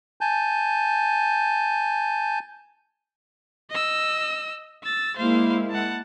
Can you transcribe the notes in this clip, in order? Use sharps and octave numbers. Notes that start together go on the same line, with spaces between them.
G#5 A5 G6
D#5 E6
E6 A6
G#3 A#3 E4 C5 F5
F#5 A5